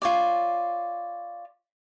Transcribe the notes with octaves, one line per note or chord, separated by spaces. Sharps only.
F4 C#5 D5